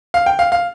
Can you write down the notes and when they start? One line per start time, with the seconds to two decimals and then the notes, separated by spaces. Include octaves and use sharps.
0.14 F5
0.26 G5
0.39 F5
0.52 F5